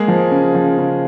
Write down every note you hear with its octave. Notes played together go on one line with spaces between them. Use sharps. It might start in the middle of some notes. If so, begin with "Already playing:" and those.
Already playing: G#3 A#3 G#4
F3
C#3
F3
C#3